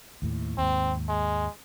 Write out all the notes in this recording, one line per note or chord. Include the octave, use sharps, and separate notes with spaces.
D#2 A2
D#2 G#2 C4
G#3